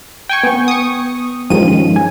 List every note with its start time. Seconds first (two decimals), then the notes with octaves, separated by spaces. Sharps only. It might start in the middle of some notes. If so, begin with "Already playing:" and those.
0.29 G5 G#5 C#6
0.43 B3
0.68 C#6 D#6
1.50 G2 D#3 F3 G#3 C#4 D#7
1.96 G#5